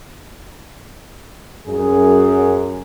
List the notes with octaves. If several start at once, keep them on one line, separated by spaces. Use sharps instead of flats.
F#2 G#4